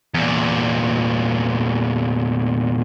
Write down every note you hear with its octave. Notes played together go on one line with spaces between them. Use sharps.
E2 A#2